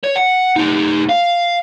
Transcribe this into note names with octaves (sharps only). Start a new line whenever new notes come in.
C#5
F#5
A3 D#4
F5